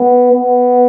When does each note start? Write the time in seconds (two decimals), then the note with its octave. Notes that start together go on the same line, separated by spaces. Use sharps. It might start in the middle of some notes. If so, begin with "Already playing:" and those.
Already playing: B3
0.33 B3